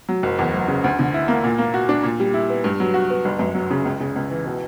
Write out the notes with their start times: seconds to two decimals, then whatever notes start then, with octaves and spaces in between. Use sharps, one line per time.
0.09 F#3
0.23 F#1
0.39 E2
0.53 F#1
0.68 C#3
0.84 D2
0.99 D3
1.14 E4
1.28 A#3
1.44 A#2
1.58 A#3
1.74 F#4
1.89 D4
2.03 A#2
2.20 G3
2.34 E4
2.50 B3
2.64 G2
2.80 F#3
2.94 F#4
3.10 B3
3.25 G1
3.39 F#2
3.55 F#3
3.71 C#3
3.85 C#2
4.00 C#3
4.16 C#2
4.30 E3
4.46 B2